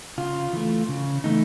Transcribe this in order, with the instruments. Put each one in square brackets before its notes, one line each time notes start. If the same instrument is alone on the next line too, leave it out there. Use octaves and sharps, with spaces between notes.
[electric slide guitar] C#3 F4
E3 A3
C#3
E3 A3 D#4